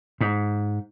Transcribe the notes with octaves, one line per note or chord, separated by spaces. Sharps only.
G#2